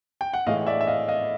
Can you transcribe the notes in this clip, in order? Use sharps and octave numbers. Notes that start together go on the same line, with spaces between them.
G5
F#5
A2 E3 G#3 D#5 F5
D5 E5
E5
D#5 F5
D#5 F5